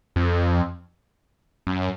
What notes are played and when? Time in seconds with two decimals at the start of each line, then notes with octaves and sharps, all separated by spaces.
0.16 F2
1.67 F#2